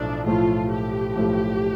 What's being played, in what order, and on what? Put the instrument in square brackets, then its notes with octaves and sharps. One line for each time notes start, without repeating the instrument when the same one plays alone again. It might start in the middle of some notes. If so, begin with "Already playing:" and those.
Already playing: [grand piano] B1 A2 F3 A3 [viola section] D4
[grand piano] B1 A2 F3 A3 [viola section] F4
[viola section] G4
[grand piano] B1 A2 F3 A3